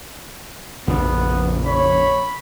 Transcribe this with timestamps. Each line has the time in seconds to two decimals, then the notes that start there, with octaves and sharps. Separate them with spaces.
0.87 A#1 F2 C#3 B3 D4
1.67 C#5 B5